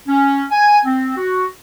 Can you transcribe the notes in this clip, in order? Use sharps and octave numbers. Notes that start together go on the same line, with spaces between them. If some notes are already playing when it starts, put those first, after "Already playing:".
C#4
G#5
C4
F#4